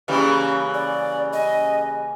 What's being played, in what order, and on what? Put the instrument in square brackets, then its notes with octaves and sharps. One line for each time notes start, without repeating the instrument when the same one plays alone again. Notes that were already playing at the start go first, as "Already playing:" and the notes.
[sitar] C#3 E3 G3 [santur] A#3 C#4 G#4
[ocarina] D5
[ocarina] D#5 [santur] G#5